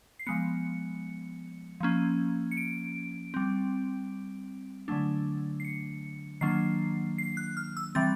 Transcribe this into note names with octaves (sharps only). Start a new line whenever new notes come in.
C7
F3 G#3 B3 C#7
F3 A#3 C#4
C#7
D7
G3 C4
D3 F#3 A3 D4
C7
C#7
D#3 F#3 A#3 D4 C7
C7
F#6
F6
E6
E3 G3 C4 A6